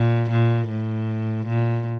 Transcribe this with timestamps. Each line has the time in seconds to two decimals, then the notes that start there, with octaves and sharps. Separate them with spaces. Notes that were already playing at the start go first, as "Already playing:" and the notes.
Already playing: A#2
0.31 A#2
0.70 A2
1.47 A#2